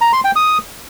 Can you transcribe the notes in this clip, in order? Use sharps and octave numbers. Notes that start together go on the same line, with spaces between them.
A#5
C6
G5
D#6